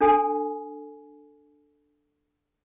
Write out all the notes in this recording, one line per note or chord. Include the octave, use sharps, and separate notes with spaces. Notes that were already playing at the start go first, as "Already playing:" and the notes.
D4 A4 G#5